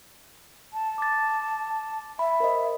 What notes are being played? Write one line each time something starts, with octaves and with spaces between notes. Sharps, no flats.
A5
D6 A6
E5 B5
A#4 C5 D#5